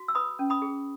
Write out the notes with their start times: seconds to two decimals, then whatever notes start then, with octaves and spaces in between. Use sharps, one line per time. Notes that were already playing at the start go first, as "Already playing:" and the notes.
Already playing: F#4
0.08 E6
0.15 B4 B5 D#6
0.39 C#4
0.50 B5 D#6
0.62 G#4